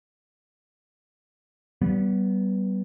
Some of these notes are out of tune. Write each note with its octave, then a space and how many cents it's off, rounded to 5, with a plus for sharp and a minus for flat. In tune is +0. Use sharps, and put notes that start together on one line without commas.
G3 -30 B3 -10